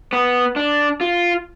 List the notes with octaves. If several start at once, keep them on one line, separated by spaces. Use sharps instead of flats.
B3
D4
F4